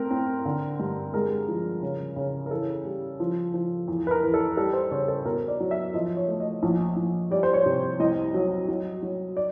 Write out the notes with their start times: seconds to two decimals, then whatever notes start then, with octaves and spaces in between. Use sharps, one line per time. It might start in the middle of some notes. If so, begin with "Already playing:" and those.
Already playing: A3 C4 A#4
0.11 C4
0.45 D3
0.80 G2
1.14 G#3 A#4
1.48 F3
1.82 C#3
2.16 C#3
2.46 A#4
2.51 E3 A4
2.85 G3
3.20 F3
3.54 F3
3.88 E2
4.07 B4
4.11 A#4
4.23 E3
4.34 A4
4.57 G3 A4
4.73 C5
4.91 C#3 C#5
5.08 A4
5.25 B2 A#4
5.48 D5
5.60 F#3
5.71 E5
5.94 F3 D#5
6.17 C#5
6.28 A3
6.40 D#5
6.63 A#1
6.96 A#1
7.31 G3 D5
7.43 C5
7.54 C#5
7.66 C3
8.00 C2 D#5
8.34 F#3
8.68 F#3
9.03 F#3
9.37 D5